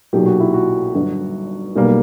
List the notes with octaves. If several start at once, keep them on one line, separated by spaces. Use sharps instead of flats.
B1 A#2 F#3 G4
F#4
E4
F#4
G1 G2 F#3
B1 B2 G3 A#3